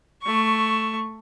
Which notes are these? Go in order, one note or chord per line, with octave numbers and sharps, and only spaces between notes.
A3 C#6